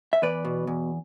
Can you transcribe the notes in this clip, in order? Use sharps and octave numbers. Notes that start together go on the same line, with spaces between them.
E5
E2 B4 D5
B2
E2